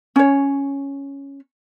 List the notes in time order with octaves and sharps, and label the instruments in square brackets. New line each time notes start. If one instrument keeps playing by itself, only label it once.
[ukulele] C#4 C#5